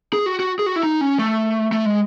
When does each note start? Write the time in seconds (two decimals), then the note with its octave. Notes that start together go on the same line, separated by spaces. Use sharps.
0.13 G#4
0.26 F#4
0.40 F#4
0.59 G#4
0.66 F#4
0.76 E4
0.83 D#4
1.01 C#4
1.19 A3
1.72 A3
1.86 G#3